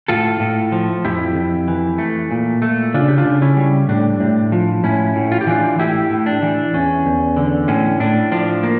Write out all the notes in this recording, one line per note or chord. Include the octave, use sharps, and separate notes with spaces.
A2 F4 A4
A2
F3
F2 E4 G4
F2
E3
A3
A#2
A3
C#3 D4 F4
G4
D4 F4
C#3
C#4 E4
G3
A2 D4
A2
F3
A2 C#4 E4
A2
F4
G4
E3 D4 F4
A2 E4 G4
A2
D4
E3
E2 C#4
E2
D3
A2 C#4
A2 D4
F3 D4
A#3